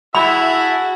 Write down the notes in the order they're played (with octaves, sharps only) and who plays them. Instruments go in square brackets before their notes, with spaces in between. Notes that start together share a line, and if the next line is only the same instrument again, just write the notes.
[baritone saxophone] E4 [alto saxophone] F#4 [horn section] G#4 E5 A5 [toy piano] B5